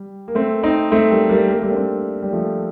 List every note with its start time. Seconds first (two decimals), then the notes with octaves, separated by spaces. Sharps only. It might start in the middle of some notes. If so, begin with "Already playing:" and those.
Already playing: G3
0.28 A#3
0.35 A3 C4
0.63 C4 D#4
0.92 A3 C4
1.11 G3 A#3
1.29 G3 A#3
1.48 A#3
1.56 A3
1.63 G3 A#3
1.72 D4
1.76 A3 C4
2.22 G3
2.33 F3 A3